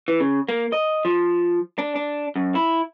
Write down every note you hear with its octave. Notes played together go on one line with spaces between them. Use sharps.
E3
C#3
A#3
D#5
F3
D4
D4
F#2
E4